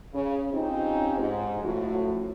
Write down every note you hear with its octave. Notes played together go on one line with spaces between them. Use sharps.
C#3
C4 C#4 D#4 F4 G4
G#2
F#2 A2 F3 A3 F#4